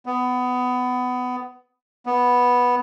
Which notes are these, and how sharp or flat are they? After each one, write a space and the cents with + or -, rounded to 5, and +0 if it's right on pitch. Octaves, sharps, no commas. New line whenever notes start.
B3 +20
B3 -5